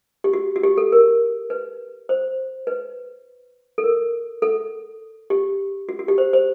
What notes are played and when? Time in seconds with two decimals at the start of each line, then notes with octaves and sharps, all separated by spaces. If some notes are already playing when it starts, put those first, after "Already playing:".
0.24 G4
0.33 F#4
0.56 F#4
0.63 G4
0.77 A4
0.92 A#4
1.50 B4
2.09 C5
2.67 B4
3.78 A4
3.84 A#4
4.42 A4
5.30 G4
5.89 F#4
5.99 F#4
6.08 G4
6.18 C5
6.33 C5